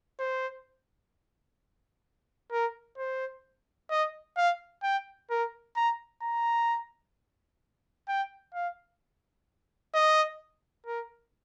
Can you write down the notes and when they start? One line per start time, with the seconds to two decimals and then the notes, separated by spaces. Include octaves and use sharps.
0.20 C5
2.52 A#4
2.98 C5
3.91 D#5
4.37 F5
4.83 G5
5.30 A#4
5.77 A#5
6.22 A#5
8.09 G5
8.54 F5
9.94 D#5
10.87 A#4